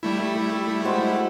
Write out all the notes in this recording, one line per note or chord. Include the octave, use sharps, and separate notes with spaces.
G3 A3 E4
G#3 F#4 C5